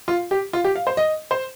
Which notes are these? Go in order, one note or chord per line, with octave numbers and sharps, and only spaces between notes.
F4
G4
F4
G4
F5
C5
D#5
C5